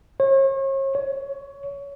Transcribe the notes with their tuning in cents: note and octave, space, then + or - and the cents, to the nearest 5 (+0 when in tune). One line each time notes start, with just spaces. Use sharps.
C#5 -40
C#5 +20